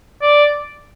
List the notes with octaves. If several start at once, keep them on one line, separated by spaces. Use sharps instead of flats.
D5